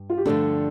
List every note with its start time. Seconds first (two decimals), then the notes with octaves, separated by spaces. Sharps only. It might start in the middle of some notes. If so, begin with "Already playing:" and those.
Already playing: G2
0.10 F4
0.18 G4
0.26 G2 D3 F3 A3 D4 A4